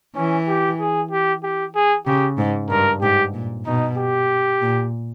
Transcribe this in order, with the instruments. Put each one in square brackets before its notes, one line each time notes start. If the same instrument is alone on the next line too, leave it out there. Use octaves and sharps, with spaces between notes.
[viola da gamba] E3 [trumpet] C#4
[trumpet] G4
G#4
G4
G4
G#4
[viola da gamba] C#3 [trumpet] G4
[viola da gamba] G#2
[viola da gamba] G2 [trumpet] A#4
[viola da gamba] G#2 [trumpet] G4
[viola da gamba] A#2
[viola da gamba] B2 [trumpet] D#4
[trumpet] G4
[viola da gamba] A#2